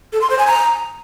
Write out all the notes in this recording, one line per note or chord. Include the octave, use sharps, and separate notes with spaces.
A4
C6
C5
G#5
A#5